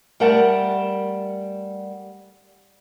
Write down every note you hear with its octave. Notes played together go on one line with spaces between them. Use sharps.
G3 A3 A#4 F#5 A5